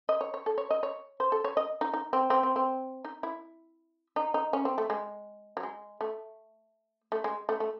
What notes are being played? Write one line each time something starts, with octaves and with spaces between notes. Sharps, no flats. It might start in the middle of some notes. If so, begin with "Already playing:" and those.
D#5
C#5
C#5
A4
C#5
D#5
C#5
C5
A4
C#5
D#5
D#4
D#4
C4
C4
C4
C4
D#4
E4
D#4
D#4
C#4
C4
A3
G#3
F#3
G#3
A3
A3
G#3
A3
A3